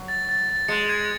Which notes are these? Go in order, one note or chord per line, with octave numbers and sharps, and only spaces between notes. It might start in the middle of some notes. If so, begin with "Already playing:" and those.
Already playing: F#3
A6
A6
A6
G#3 C#7
G#6